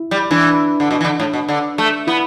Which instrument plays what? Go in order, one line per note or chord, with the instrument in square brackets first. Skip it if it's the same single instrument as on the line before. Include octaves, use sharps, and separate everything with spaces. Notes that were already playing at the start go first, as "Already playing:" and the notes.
Already playing: [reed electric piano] E4
[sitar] G3
[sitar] E3 [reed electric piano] D4
[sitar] D3
B2
E3
D3
A2
B2
D3
A3
[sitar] B3 [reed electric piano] E4